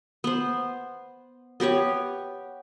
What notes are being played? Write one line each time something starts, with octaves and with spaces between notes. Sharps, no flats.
B3 C5
B3 G4 B4 C#5